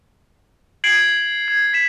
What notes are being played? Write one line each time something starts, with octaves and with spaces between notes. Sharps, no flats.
G#6 C7 D7 F#7
G#6
B6 E7